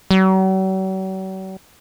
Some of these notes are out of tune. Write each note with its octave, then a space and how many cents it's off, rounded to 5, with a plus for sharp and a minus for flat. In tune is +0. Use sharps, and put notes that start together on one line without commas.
F#3 +45